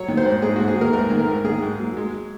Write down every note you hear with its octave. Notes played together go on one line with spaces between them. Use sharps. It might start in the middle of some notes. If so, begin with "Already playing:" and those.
Already playing: F#3 C#5
D#3
C5
G#2
G#2 G#4
G#2 F#4
G#4
D#3
A#4
G#2 A#4
D#3
A#4
G#2
D#3 G#4
G#2
F#3
G#3